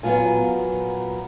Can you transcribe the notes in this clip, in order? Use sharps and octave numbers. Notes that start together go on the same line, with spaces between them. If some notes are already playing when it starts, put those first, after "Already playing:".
A#2 F#3 B3 F4 G#5